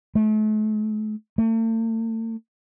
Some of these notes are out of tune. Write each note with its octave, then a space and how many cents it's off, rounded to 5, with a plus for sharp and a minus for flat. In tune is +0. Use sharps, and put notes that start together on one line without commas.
A3 -40
A3 +40